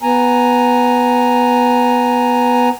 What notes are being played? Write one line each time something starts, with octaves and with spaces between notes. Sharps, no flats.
B3 G#5 A#5